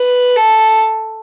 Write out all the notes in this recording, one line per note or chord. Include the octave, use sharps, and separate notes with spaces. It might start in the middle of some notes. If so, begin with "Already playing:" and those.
Already playing: B4
A4